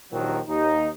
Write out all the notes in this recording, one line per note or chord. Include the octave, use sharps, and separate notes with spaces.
A#1 D#2 A#2 D#3 F3 F#3
D#2 D#4